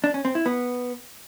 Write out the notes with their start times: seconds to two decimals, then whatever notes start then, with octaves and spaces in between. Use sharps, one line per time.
0.04 D4
0.14 C#4
0.25 C4
0.35 E4
0.46 B3